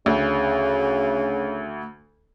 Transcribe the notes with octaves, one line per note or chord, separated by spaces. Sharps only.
D2 C#3